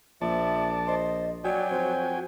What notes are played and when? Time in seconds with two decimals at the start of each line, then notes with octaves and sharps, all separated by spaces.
0.22 A#1 F3 D5 E5 A5
0.87 C5 D#5
1.44 F#3 F#4 D5 G5 G#5
1.70 F2 C5